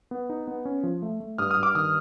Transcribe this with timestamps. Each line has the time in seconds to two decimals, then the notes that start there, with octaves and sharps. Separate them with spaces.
0.11 B3
0.30 D#4
0.47 B3
0.65 C#4
0.83 F3
1.02 A3
1.20 A3
1.38 G2 D#6 F6
1.51 D#6 F6
1.57 G2
1.63 D6 E6
1.75 D#3 D#6 F6